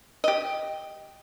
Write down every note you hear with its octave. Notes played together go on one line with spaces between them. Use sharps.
G4 D#5